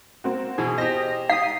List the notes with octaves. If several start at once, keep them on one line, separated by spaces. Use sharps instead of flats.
A#3 C4 F#4
B2 E3 G#4
B2 G4 C5 D#5 A#6
D#4 F5 D#6 B6 C7